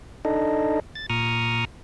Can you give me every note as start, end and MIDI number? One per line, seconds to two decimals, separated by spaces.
0.25 0.80 62
0.25 0.80 63
0.25 0.80 69
0.25 0.80 75
0.95 1.06 93
1.10 1.65 46
1.10 1.65 82
1.10 1.65 85
1.10 1.65 87
1.10 1.65 89